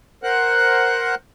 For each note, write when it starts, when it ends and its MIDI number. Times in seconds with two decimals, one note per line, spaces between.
0.23 1.15 70
0.23 1.15 72
0.23 1.15 78
0.23 1.15 90